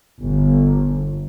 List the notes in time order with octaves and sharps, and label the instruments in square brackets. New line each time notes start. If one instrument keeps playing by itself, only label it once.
[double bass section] G1